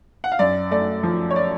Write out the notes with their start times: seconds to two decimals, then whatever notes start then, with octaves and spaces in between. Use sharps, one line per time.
0.24 F#5
0.32 F5
0.39 F#2 D5
0.71 A3 D5
1.03 F3
1.31 C#5
1.36 D5